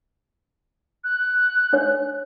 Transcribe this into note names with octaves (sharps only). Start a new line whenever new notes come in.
F#6
D4 C#5